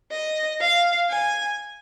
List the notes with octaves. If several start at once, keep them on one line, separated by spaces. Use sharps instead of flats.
D#5
F5
G#5